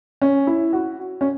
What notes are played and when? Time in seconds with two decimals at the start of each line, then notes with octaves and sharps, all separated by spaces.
0.21 C#4
0.47 E4
0.73 F#4
1.21 C#4